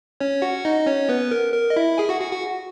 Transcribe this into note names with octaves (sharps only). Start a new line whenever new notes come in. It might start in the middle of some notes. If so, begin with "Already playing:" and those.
C#4 C#5
F#4 F#5
D#4 D#5
C#4 C#5
B3 B4
A#4
A#4
D#5
E4 E5
G#4 G#5
F#4 F#5
F#4 F#5
F#4 F#5